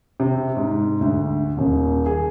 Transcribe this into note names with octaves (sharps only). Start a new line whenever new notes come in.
C3
G#2
D2
D#1
G#4